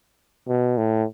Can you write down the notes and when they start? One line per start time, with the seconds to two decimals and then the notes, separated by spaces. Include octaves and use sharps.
0.48 B2
0.78 A2